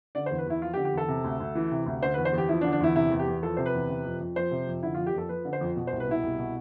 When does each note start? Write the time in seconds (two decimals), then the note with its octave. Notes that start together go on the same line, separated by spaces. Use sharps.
0.15 D3 D5
0.26 C5
0.31 E2
0.38 B4
0.46 E2 E4
0.62 F3 F4
0.73 G4
0.77 D3
0.85 G4
0.93 E2 A4
1.08 C3
1.24 D2
1.40 D2
1.55 E3
1.72 C3
1.86 D2
2.02 D3 C5
2.14 B4
2.18 E2
2.25 C5
2.33 E2
2.38 G4
2.49 F3 E4
2.61 D4
2.64 D3
2.72 D4
2.80 E2 E4
2.95 C3 E4
3.11 E2
3.19 G4
3.27 E2
3.42 F3 A4
3.57 C3 C5
3.66 B4
3.74 E2
3.90 C3
4.04 F2
4.20 F2
4.36 F3 C5
4.51 C3
4.67 F2
4.83 D3 E4
4.94 F4
4.98 F2
5.06 G4
5.14 F2 A4
5.29 F3 B4
5.45 D3
5.53 C5
5.61 F2
5.76 B2
5.87 C5
5.92 C2
6.00 B4
6.08 B2 E4
6.23 C2
6.39 B2